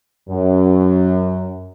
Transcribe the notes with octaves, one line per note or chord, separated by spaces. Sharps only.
F#2